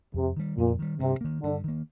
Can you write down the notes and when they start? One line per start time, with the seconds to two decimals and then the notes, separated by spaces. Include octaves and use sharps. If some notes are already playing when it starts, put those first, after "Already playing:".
0.14 F2 C3
0.37 D#3 G3
0.57 F2 A#2
0.79 D#3 G3
0.99 G2 C3
1.21 D#3 A#3
1.42 G2 D3
1.64 D#3 A#3